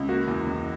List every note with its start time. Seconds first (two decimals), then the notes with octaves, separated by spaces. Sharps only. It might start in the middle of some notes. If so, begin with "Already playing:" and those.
Already playing: C#2
0.09 A#3 F#4
0.28 E2
0.47 E2